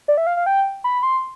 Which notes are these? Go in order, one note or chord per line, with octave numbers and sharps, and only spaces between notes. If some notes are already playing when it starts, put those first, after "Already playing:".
D5
E5
F5
F5
G5
B5
C6